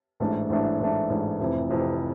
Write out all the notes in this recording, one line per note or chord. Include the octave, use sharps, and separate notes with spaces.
A1 G#2 E3 A3 D4
A1 G#2 E3 A3 D4
A1 G#2 E3 A3 D4
A1 G#2 E3 A3 D4
F1 F2 C3 E3
F1 F2 C3 E3